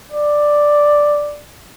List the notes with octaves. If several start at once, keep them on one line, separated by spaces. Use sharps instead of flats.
D5